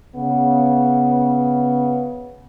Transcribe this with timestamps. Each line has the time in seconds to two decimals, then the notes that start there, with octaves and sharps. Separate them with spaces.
0.16 C#3 B3